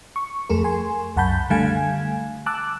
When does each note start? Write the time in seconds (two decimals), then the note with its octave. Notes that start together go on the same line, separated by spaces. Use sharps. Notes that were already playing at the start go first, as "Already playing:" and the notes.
0.16 C#6
0.49 F2 A3 G#4 A#4
0.64 G#5 C6
1.16 C2 F#2 F#5 A5 B5 G6
1.50 D3 G3 A3 F5 G#5 G#6
2.46 A5 D6 E6 F#6